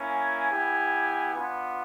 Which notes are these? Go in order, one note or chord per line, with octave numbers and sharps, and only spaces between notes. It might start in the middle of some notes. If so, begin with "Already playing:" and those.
Already playing: A#3 C#4 E4
G#5
B3 E4 G4
B3 D4 F4